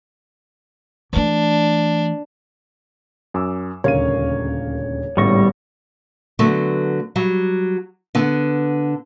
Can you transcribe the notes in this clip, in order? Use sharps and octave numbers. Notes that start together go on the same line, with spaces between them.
E3 A3 D4
F#2 G#5 D6 E6
D#1 D2 C#3 A#4 C#5 F5 D#7
G#1 A2 C#3 G3 B3 C#6 A#6
D3 F#3 A3 B3
F#3 G3
D3 B3